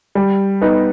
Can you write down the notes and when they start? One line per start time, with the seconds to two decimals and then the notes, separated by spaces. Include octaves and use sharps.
0.15 G3
0.61 B3 D#4